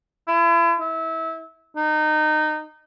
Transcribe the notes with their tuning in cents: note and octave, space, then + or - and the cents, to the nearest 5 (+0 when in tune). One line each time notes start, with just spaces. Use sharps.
E4 +40
E4 -25
D#4 -20